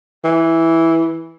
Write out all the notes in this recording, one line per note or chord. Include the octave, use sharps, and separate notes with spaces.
E3